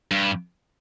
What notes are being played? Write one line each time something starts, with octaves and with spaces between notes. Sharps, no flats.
G2